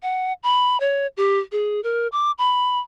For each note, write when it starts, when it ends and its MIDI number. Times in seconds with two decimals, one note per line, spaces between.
0.03 0.33 78
0.43 0.79 83
0.80 1.07 73
1.17 1.39 67
1.52 1.80 68
1.84 2.08 70
2.12 2.31 86
2.38 2.79 83